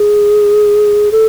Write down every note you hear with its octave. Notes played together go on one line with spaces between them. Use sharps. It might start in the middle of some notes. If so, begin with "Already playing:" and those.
Already playing: G#4
A4